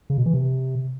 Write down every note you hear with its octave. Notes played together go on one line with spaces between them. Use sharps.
C#3
B2
E3
C3